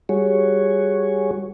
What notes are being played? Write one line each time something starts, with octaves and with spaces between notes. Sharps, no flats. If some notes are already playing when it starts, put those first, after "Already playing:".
G3 F#4 G#4 C#5